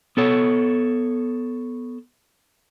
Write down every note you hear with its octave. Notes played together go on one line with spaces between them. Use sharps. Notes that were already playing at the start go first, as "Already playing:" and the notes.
B3 A4 C#5